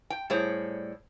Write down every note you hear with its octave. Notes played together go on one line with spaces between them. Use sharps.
G5
A2 G3 G#4 C5 C#5